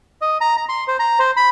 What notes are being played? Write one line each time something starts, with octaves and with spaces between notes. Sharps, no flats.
D#5
A#5
A#5
C6
C5
A#5
C5
B5